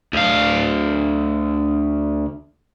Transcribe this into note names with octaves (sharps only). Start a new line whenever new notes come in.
D2 F5